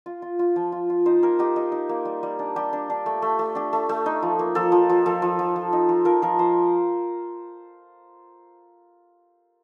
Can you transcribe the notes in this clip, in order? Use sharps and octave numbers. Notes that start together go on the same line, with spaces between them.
F4
F4
F4
F3
F4
F4
D#4 C5
A#3 A#4
D#4 G4
D#4
D#4
A#3
G3
G3
D4
G3 G4
D4
D4
A3
A3
A3
D4 G4
A3
A3
D#4
F3
A#3
F3 A4
F3
F3
F3 A4
F3
F3
F3
D#4
F3
F3 A#4
F3 A#4
F3 C5